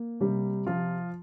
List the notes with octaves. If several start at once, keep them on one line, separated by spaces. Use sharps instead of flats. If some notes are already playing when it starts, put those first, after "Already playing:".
Already playing: A#3
C3 G3 G4
F3 F4